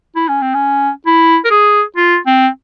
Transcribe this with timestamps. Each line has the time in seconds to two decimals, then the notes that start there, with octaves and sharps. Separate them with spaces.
0.16 E4
0.29 C#4
0.42 C4
0.54 C#4
1.06 E4
1.45 A#4
1.51 G#4
1.96 F4
2.27 C4